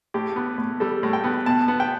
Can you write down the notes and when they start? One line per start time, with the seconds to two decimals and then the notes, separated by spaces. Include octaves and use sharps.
0.14 A2 G4
0.36 B3
0.58 A2
0.80 G3 A4
1.03 A2
1.13 G5
1.24 B3
1.46 B2 A5
1.68 B3
1.80 G5